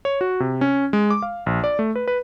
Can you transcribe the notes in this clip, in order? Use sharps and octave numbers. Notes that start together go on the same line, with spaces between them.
C#5
F#4
C3
C#4
G#3
D6
F5
A#1
D5
A3
B4
B4